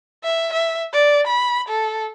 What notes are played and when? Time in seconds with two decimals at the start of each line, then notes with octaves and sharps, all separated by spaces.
0.24 E5
0.53 E5
0.93 D5
1.27 B5
1.69 A4